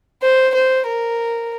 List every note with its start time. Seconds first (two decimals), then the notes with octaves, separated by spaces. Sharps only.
0.23 C5
0.54 C5
0.87 A#4